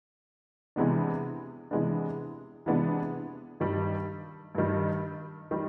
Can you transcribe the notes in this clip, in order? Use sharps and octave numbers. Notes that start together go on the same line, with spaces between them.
C3 E3 G#3 B3 D4
C3 E3 G#3 B3 D4
C3 E3 G#3 B3 D4
G2 D#3 G3
G2 D#3 G3
D#3 G3